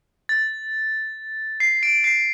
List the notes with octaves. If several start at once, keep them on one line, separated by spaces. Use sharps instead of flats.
A6
C7
D7
C7